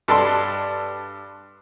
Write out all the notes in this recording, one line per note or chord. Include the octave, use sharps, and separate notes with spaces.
G2 A4 D5 A5 C6